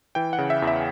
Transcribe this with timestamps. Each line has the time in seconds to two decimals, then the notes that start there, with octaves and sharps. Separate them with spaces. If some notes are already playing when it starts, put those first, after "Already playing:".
0.15 E3 G5
0.33 F#5
0.38 C#3
0.50 E5
0.62 E2
0.67 E5